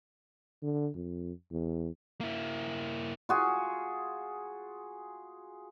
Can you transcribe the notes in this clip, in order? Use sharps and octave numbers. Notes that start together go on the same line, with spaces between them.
D3
F2
E2
A#3 E4
F4 F#4 G#4